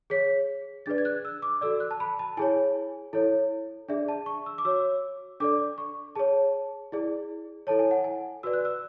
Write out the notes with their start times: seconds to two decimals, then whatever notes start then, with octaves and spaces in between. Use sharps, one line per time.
0.10 G#4 C#5 B6
0.86 D4 G#4 B4 D5 A6
0.98 G#6
1.05 F#6
1.25 E6
1.42 D6
1.61 F#4 A4 D5 E6
1.80 F#6
1.91 A5
2.00 B5
2.19 A5
2.37 E4 G#4 C#5 G#5
3.13 E4 A4 C#5
3.88 D4 G#4 D5 E5
4.08 A5
4.26 C#6
4.46 E6
4.58 D6
4.65 F#4 C#5 E6
5.40 D4 A4 D5 D6
5.78 C#6
6.15 G#4 C#5 A5
6.92 E4 G#4 D5
7.67 E4 A4 C#5 A5
7.79 G#5
7.91 F#5
8.04 G#5
8.43 F#4 B4 D5 E6
8.53 F#6
8.65 E6